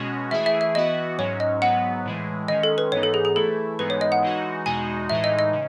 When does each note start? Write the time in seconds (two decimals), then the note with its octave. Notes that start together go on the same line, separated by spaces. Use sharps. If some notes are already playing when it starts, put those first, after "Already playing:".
Already playing: B2 G#3 C#4 F#4
0.31 E3 A3 E4 G#4 E5
0.46 E5
0.61 E5
0.75 E3 B3 F#4 D#5
1.18 G#2 F#3 C#4 C#5
1.40 D#5
1.62 G#2 F#3 B3 F#5
2.05 A2 E3 G#3
2.48 D#3 G#3 C#4 D#5
2.63 A4
2.78 B4
2.92 G#2 E3 B3 D#4 C#5
3.03 A4
3.14 G#4
3.25 G#4
3.35 E3 A3 E4 A4
3.79 G#2 E3 G#3 B3 D#4 B4
3.90 C#5
4.01 D#5
4.12 F#5
4.22 E3 G#3 D#4 F#4
4.66 E2 B2 G#3 D#4 F#4 G#5
5.09 A2 E3 G#3 D#4 E5
5.24 D#5
5.39 D#5
5.53 C#3